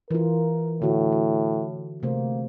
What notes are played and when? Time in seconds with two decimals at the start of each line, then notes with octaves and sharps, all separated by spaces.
0.11 E3 F4 A#4
0.82 A2 D3 F#4
1.12 F#4
2.03 C3 A3 A#3 C5